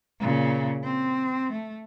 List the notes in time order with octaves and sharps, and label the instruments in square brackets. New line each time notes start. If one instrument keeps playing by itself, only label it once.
[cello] A#2 C#3
C4
A3